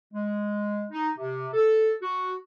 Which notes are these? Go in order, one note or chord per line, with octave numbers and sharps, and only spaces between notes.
G#3
D#4
C3
A4
F#4